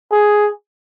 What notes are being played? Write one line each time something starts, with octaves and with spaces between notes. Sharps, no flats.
G#4